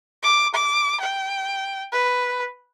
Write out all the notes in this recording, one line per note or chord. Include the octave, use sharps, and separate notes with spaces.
D6
D6
G5
B4